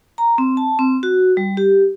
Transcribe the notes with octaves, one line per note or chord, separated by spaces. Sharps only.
A#5
C4
A5
C4
F#4
G3
G4